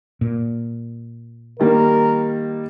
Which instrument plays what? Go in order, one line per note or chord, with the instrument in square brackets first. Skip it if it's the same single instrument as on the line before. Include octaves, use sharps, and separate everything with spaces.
[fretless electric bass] A#2
[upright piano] D#3 G3 A#3 [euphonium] A#4